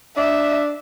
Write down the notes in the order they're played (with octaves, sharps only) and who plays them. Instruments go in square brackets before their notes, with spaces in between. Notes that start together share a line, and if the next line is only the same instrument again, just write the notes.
[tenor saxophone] D4 [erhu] E5